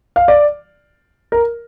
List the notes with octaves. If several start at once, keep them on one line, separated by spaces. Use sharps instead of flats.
F5
D5
A#4